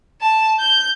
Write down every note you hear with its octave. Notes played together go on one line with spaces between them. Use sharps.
A5
G6